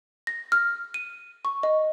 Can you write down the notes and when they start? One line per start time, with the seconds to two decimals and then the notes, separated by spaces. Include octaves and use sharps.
0.27 A#6
0.52 F6
0.94 D#7
1.45 C#6
1.63 D#5